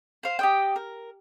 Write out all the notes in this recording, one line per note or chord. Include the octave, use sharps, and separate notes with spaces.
C5 F5
G4 D#5 G5
A#4